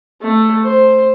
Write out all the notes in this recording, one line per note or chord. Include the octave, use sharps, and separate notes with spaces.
A3
C5